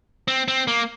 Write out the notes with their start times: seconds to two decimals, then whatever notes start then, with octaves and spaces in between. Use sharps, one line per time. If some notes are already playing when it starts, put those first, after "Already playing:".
0.28 C4
0.48 C4
0.68 A#3